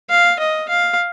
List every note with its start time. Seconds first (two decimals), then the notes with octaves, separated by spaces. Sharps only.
0.09 F5
0.39 D#5
0.69 F5